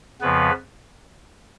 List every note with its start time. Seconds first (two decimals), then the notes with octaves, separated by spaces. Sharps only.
0.21 F2 C#3 F3 B3 B4